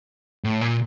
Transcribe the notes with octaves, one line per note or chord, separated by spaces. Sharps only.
A2
A#2